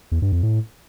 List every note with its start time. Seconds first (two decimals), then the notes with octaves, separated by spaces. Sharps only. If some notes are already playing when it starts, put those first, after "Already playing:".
0.12 E2
0.22 G2
0.32 F2
0.43 A2